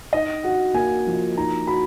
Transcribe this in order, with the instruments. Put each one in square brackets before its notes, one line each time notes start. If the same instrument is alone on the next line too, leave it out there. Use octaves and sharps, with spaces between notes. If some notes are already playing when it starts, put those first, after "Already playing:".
[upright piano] D#4 [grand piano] D#5
[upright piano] F#4 [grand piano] F#5
[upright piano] A#3 [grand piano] G#5
[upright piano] F3
[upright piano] D#4 [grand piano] A#5
[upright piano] F#4 [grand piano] B5